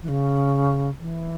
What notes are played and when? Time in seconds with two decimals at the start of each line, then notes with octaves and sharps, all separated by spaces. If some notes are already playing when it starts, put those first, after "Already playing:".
0.02 E3
0.08 C#3
1.00 E3